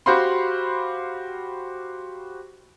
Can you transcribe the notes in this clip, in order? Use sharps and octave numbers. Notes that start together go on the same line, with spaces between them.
F#4 G4 C5 F5 B5 C6